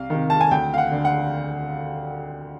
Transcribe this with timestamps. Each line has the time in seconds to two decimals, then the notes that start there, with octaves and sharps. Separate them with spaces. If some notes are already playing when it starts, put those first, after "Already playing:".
Already playing: C2 F5
0.10 C3 D#3
0.30 A5
0.41 G#5
0.51 D2 G5
0.74 F5
0.78 F#5
0.92 D3
1.05 F#5